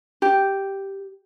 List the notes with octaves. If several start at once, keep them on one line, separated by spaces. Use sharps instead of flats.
G4